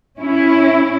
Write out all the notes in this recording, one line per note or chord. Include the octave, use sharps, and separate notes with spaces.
C#4 E4